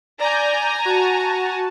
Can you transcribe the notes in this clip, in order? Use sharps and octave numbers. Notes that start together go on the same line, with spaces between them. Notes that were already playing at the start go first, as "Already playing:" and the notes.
D5 G#5 A#5 G6
F#4 A5